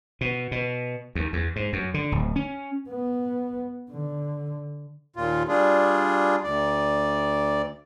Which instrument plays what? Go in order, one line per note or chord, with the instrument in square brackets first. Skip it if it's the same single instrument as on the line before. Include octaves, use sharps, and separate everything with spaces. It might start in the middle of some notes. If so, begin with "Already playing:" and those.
[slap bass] B2
B2
D#2
E2
G#2
F#2
D3
D1
C#4
[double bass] B3
D3
[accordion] D#2 A#2 F4
G3 D4 F4 G#4
D2 D5